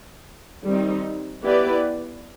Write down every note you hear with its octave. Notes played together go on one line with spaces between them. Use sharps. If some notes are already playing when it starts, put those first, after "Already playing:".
D#3 G3 C4 D#4
B3 E4 G4 B4 D5